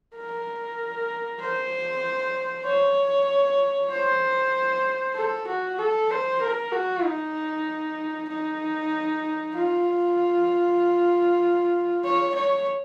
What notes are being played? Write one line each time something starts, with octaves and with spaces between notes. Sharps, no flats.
A#4
C5
C#5
C5
A4
F#4
A4
C5
A#4
F#4
D#4
D#4
F4
C#5
C#5